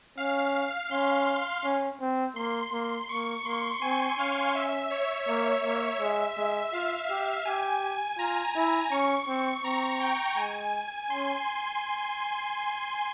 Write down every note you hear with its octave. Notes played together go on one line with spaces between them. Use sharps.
C#4 F5
C#4 C6
C#4
C4
A#3 C6
A#3 C6
A#3 C#6
A#3 C6
C4 G#5
C#4 F5
E5
C#5
A#3 C#5
A#3
G#3 E5
G#3 E5
F4 F5
G4
G4 G#5
F4 A#5
E4
C#4 C#6
C4
C4 A#5
G5
G#3 G#5
C#4 C6